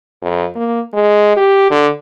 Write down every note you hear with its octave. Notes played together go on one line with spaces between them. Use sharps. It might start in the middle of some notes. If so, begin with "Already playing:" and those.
F2
A#3
G#3
G4
D3